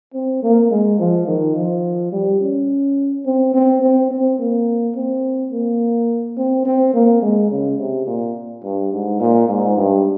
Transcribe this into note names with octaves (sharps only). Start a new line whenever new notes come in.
C4
A#3
G#3
F3
D#3
F3
G3
C#4
C4
C4
C4
C4
A#3
C4
A#3
C4
C4
A#3
G#3
C#3
C3
A#2
G2
G#2
A#2
G#2
G2